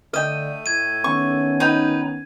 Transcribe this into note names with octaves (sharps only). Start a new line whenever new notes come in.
D3 A3 D#5 G5 F6 D#7
A2 G#6 D#7
D#3 B3 C#4 C#6
D#4 B4 G5